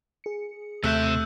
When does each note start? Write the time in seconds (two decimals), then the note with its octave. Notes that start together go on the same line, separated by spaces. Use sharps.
0.24 G#4 C#7
0.84 D#2 C3 A3 E5 E6 F#6 G6